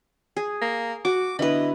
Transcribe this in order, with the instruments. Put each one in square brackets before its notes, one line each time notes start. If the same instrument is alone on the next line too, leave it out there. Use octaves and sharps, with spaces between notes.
[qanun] G#4
[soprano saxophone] A#3
[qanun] F#4 [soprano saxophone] D6
[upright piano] D3 B3 E4 [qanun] B4 B5 [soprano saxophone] D#5